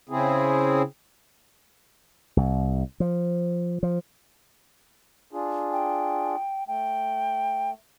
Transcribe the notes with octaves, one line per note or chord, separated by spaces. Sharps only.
C#3 C4 E4 G#4
C2
F3
F3
D4 F4 G#4
G5
A3 G5